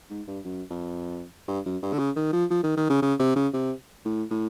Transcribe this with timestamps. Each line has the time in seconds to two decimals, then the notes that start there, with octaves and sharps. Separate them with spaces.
0.10 G#2
0.27 G2
0.45 F#2
0.70 F2
1.48 G2
1.65 F#2
1.82 G2
1.93 D3
1.99 C#3
2.16 D#3
2.33 F3
2.50 F3
2.63 D#3
2.77 D#3
2.90 C#3
3.02 C#3
3.19 C3
3.36 C#3
3.54 C3
4.05 A2
4.31 A2